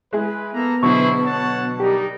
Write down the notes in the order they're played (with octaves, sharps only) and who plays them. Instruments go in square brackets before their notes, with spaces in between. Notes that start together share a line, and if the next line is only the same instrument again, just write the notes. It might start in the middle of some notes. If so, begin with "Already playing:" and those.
[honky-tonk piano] G#3 E4 G#4 [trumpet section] B4
[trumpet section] A#3 A4 A#5 [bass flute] B3
[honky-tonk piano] B2 D3 F#3 [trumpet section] E4 G#4 C5 [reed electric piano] C#6
[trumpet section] C#5 F#5 A5
[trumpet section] G3 D#4 A#4 [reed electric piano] G4